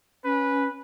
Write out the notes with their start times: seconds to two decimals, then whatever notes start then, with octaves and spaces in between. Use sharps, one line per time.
0.24 C#4 B4